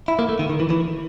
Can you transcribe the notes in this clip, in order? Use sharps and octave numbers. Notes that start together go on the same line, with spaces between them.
E4
A#3
A3
D#3
D#3
E3
E3